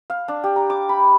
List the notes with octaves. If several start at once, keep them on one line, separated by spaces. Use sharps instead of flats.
F5
D4
G4
A#5
D6
B5